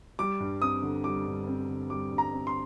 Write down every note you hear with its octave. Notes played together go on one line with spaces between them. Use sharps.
G3 D6
G2
C4 D#6
D3
G3 D6
G2
C4
D3
G3 D6
G2
A#5
C4
C6